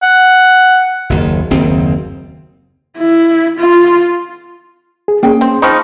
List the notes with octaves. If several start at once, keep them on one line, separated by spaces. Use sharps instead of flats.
F#5
F#1 D#2
F#1 D#2 C4
E4
F4
G#4
A#3 C#4 G#4 G5
C4
F3 C4 D#4 B5 C#6 F6